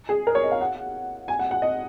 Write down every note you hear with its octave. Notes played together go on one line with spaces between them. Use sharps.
G#4
A#4
C#5
D#5
F5
F#5
G#5
F#5
F#5
D#5